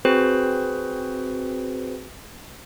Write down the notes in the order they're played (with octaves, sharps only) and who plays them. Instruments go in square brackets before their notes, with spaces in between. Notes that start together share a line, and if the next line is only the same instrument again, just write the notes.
[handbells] C4 F#4 G#4 B4 C5